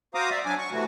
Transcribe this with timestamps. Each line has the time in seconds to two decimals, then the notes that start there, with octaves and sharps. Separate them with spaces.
0.15 F#4 C5 F5 A#5 D6 D#6
0.30 D5 E5
0.45 F#3 D4 G#5 D6
0.58 C#6
0.72 C3 E3 A3 B3 F#4